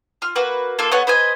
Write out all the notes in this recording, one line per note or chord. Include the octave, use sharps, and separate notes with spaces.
F4 F6
A#3 F#4 B4
A#3 F4 A4
B3 A4 C#5 F#5
B4 C5 D#5 G#5